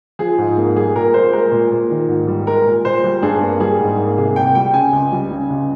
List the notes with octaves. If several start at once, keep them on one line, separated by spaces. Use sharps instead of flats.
F3 G#4
G#2
A#3
G3 G#4
A#2 A#4
A#3 C5
G#3 A#4
A#2
A#2
D#3
G#2
G3
G#3 A#4
A#2
A#2 C5
G3
G2 G#4
A#3
G3 G#4
G#2
A#3
C3 G#4
C2 G5
G3 G5
C#3 G#5
C#2
G3
C#3
C#2